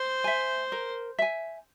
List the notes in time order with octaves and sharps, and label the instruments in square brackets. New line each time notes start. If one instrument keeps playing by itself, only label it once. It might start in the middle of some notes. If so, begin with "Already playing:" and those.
Already playing: [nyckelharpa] C5
[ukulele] E5 G#5
A#4
E5 G#5